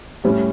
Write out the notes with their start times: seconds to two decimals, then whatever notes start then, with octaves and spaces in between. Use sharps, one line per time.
0.24 A2 G3 C#4 G4